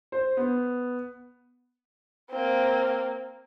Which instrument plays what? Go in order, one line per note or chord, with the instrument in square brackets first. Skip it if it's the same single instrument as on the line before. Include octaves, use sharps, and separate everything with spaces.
[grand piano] C5
B3
[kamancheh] A#3 C4